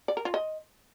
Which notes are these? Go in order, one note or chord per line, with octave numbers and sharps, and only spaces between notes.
D5
A#4
F4
D#5